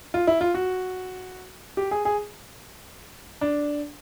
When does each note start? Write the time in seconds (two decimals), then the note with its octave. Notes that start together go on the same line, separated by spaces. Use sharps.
0.14 F4
0.27 E4
0.41 F4
0.54 F#4
1.77 G4
1.91 G#4
2.05 G#4
3.41 D4